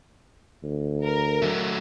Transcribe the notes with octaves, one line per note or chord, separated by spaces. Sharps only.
D2
A#4
F#3 A3